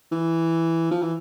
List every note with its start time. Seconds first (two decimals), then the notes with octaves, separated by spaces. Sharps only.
0.12 E3
0.91 F3
1.02 E3